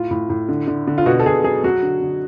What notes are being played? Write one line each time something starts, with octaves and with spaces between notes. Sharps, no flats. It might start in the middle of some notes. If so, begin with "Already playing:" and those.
Already playing: A2 F4
A2
A2
D3
D3
D3
F4
B2 F#4
A4
B2 G#4
F#3 G#4
F#3 F#4
D3
D3